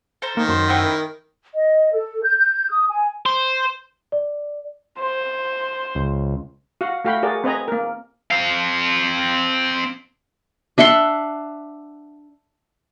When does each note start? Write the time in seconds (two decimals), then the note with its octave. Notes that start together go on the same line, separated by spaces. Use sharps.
0.22 A4 C5 A#5
0.37 D#3 A#3
0.49 F#2 C6
0.68 A3 C4 E4 F#5
0.83 A#4
1.55 D#5
1.93 A4
2.23 G6
2.39 G6
2.71 D#6
2.89 G#5
3.26 C5
4.12 D5
5.01 C5
5.95 C#2
6.81 F#4 F5 F#5
7.04 A3 F#4 F5 G5 B5
7.23 F#4 G#4 A#4 D5
7.44 C4 B4 D#5 G#5 A#5
7.68 A#3 A#4
8.30 C4 F5
10.78 D4 E5 F#5 C6